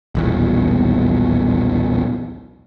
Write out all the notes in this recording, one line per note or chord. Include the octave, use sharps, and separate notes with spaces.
D#1 B1 E2